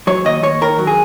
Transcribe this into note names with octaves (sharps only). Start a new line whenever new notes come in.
F#3 C#5
D#2 D#5
D#2 C#5
D#3 A#4
F#3
G#4